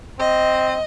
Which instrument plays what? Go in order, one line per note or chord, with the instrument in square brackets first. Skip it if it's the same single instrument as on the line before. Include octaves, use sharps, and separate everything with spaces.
[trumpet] C4 [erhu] D#5